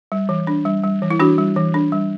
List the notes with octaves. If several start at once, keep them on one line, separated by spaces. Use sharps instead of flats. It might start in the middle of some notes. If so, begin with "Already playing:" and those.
G3
E3
D4
G3
G3
E3
E4
E3 D4 F#4
G3
E3
D4
G3